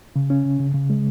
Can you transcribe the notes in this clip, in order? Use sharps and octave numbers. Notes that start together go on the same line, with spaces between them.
C#3
C#4
C#3
C#3
C#3
G#3